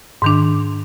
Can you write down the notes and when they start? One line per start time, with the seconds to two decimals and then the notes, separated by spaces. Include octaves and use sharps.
0.22 G#2 D#3 D4